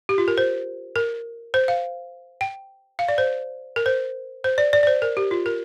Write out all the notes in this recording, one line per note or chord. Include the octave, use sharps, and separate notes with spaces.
G4
F4
A#4
C5
A#4
C5
F5
G5
F5
D5
C5
A#4
C5
C5
D5
D5
D5
C5
A#4
G4
F4
A#4